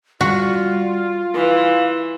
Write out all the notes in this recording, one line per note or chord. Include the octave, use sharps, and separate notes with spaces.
G3 F4 F#4
E3 F5